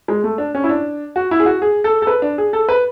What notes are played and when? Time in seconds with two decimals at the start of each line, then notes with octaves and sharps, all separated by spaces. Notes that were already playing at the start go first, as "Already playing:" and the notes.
0.08 G#3
0.24 A3
0.38 D4
0.55 C#4
0.64 E4
0.69 D4
1.16 F#4
1.31 E4
1.40 G#4
1.46 F#4
1.62 G#4
1.84 A4
2.02 A4
2.07 B4
2.22 D4
2.38 G#4
2.53 A4
2.69 B4